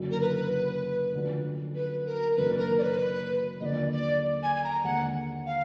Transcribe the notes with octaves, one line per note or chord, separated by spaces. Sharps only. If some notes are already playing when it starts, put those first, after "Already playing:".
Already playing: F#1 F#2 D3 F#3
A#4
B4
D2 D3 F3
B4
A#4
F#1 F#2 D#3 A#3 D4 B4
A#4
D5
B4
D#2 D3 F3 A#3 D5 D#5
D5
G#5
G#5
A#5
D#2 D3 G#3 F#5
F5